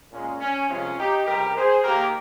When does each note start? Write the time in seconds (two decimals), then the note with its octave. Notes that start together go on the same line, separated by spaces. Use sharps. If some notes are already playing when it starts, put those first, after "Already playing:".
0.11 A#2 G#3 C#4
0.40 C#4
0.68 C2 C3 F3 G#3 C#4 F4
0.98 D#4 G4
1.26 C#2 C3 G3 G4 A#4
1.55 G#4 C5
1.84 D#2 D#3 A#3 G4 A#4